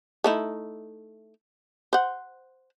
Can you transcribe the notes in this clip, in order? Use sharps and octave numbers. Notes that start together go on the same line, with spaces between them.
A3 D#4 E4
C5 F#5